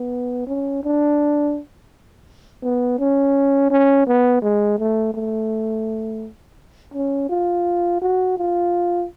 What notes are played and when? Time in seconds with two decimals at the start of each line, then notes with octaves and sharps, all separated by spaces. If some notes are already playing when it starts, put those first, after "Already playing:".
Already playing: B3
0.47 C#4
0.84 D4
2.63 B3
2.99 C#4
3.70 C#4
4.07 B3
4.42 G#3
4.78 A3
5.14 A3
6.94 C#4
7.29 F4
8.01 F#4
8.37 F4